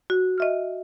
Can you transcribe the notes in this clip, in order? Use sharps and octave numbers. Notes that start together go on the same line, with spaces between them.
F#4
D#5 E5 F6